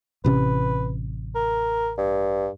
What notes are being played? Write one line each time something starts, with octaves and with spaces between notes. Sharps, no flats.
A1 C3 C#4 B4
A#4
G2